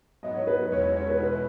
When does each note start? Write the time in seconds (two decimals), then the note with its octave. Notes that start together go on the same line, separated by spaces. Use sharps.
0.23 G#2 F#3 B3 D#5
0.35 C#5
0.47 B4
0.59 B4
0.71 E2 B2 G#3 C#4 E4 C#5
0.97 C#5
1.09 B4
1.20 B4